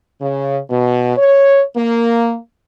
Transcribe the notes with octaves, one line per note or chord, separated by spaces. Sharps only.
C#3
B2
C#5
A#3